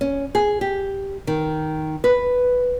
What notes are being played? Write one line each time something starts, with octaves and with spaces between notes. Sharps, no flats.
C#4
G#4
G4
D#3
B4